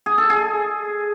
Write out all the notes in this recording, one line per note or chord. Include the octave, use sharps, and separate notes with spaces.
G#4
A4
G#4